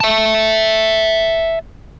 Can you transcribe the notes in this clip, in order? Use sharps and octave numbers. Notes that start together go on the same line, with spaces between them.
E5 A5